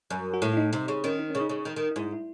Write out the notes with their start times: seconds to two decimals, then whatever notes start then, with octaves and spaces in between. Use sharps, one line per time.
0.10 F#2
0.34 F#4
0.42 A2 E4
0.53 E4
0.57 D#4
0.73 C3 D#4
0.88 C#3
1.04 D#3 C#4
1.19 D#4
1.30 C#3 C#4
1.41 D#4
1.49 C#3
1.65 D#3
1.76 D#3
1.91 D#4
1.96 G#2 E4
2.12 E4